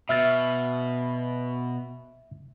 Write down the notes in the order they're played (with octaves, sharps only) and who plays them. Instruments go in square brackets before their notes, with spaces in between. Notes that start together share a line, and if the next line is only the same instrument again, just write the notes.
[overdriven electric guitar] B2 [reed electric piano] E5 F6 A6